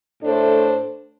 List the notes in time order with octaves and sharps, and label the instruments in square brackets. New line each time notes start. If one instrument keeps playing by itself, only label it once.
[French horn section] A2 A3 D4 A4 C5